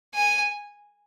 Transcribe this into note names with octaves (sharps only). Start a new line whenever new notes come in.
G#5